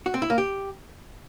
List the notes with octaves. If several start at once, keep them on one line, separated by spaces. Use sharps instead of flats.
F#4
C4
E4
A#3
G4